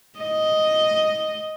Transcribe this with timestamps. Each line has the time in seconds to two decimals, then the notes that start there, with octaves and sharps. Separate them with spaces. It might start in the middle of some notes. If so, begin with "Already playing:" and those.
0.20 D#5